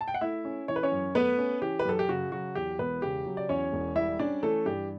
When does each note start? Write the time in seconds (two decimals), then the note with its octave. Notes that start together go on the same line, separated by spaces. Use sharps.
0.01 A5
0.08 G5
0.14 F#5
0.21 A3 E4 E5
0.45 C#4
0.68 E3 C#5
0.76 B4
0.83 C#4 C#5
0.92 F#2
1.15 A3 B3 B4
1.38 C#4
1.62 E3 G4
1.79 B4
1.85 F#2 A4
1.99 G4
2.09 C#3 F#4
2.32 F#3 F#4
2.55 E2 G4
2.79 E1 B3 B4
3.02 C#3 G4
3.26 F#3
3.37 D5
3.49 E2 C#4 C#5
3.73 E1
3.96 G3 E4 E5
4.19 C#4 D4 D5
4.42 E3 A3 A4
4.66 G2 G4